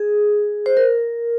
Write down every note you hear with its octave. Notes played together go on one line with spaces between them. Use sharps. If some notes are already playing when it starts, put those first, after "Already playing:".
Already playing: G#4
C5
A#4